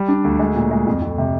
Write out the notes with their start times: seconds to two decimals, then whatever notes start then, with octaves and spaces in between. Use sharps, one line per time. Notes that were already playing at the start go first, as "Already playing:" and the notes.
Already playing: G3
0.08 D4
0.24 D2
0.39 G#3
0.55 A#2
0.71 G#3
0.87 F2
1.02 F2
1.18 C3